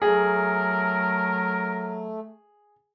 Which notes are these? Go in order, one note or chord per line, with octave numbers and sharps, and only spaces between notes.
F#3 A3 G#4 A#4